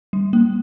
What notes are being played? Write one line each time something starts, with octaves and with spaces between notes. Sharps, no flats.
G3
A#3